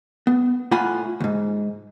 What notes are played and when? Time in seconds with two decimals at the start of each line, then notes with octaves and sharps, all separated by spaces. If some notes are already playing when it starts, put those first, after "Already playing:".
0.27 B3
0.71 A2 A3 F4 F#5 G#5 B5
1.20 D2 G#2